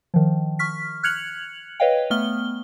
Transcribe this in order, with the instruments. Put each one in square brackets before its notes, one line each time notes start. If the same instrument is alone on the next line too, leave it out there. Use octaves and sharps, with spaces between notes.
[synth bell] D#3 F3
C#6 F6 B6
F6 F#6 G#6 C#7 F7 F#7
B4 C#5 D#5 F5 G5
A3 B3 F6 G7